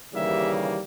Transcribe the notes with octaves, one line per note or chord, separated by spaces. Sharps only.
D#2 C#3 E3 G3 A#3 E5